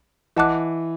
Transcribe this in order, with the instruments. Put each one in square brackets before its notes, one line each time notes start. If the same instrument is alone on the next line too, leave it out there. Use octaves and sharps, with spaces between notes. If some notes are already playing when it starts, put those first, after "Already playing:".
[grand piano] E3 [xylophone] D#5 F#5 A5 D6 F#6